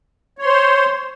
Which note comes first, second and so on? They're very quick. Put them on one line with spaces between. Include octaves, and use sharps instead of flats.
C#5 C6 C5